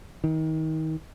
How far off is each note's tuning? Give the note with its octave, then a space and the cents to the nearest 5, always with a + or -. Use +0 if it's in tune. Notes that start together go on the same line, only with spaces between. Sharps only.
D#3 +30